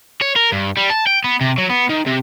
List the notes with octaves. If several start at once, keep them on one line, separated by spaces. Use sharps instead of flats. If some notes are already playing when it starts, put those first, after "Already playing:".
C#5
A#4
G2
G3
A5
G5
B3
C3
F#3
B3
D#3
C3